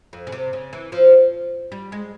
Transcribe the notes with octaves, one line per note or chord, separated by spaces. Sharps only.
F2
C#3
C3
C#3
E3
F3
G3
G#3